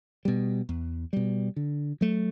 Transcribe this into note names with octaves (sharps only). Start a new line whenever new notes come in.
B2 G3
E2
B2 G3
D3
F#3 A3